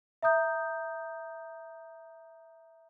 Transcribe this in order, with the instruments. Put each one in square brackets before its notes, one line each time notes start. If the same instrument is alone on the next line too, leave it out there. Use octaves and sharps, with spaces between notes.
[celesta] E5 A#5 D#6 G6